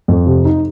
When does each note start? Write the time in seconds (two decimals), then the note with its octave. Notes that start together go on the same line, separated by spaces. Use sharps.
0.08 F2
0.27 C3
0.45 D#4